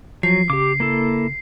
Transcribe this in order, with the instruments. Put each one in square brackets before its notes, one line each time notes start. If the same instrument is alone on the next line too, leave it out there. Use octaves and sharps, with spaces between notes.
[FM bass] F3 [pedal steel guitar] F#3 [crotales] C7
[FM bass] C#3 [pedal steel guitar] G4 D6
[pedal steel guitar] A#3 E4 A4